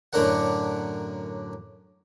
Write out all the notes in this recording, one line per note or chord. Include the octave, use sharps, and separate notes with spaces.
F#2 A2 D3 D4 A#4 F#5